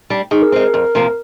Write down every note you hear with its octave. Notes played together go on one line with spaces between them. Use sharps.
G3 D4
D#3 G#4
A#4
G#3 C4 A#4
A#4
F2 A#4
C3 F3 A#3